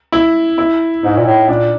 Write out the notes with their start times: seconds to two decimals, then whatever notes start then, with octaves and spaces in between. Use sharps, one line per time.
0.12 E4
0.58 E4
1.03 G#2 D#4
1.17 A#2
1.26 A2
1.49 A#2 D4